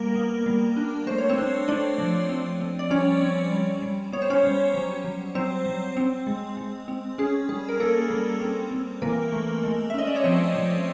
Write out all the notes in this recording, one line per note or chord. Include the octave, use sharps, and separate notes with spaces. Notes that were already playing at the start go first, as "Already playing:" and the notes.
Already playing: G3 A#3 A#4
B3
G3
D4
A3 C5
C#5
C4 C5
D4
A3 D4 D5
F3
C4
C4
D5
G3 C#4 C#5
C4
G3
G3
B3 C#5
C5
C#4 C#5
G3
F#3
F#3
F#3 C4 C5
F#3
C4
G#3
G#3
C4
C#4 G#4
G3 G#4
A#4
A#3 A4
G3
C4
C4
E3 A#3 A#4
A3
G#3
E5
C#4 D#5
D5
C#5
F3 C4 C5
F3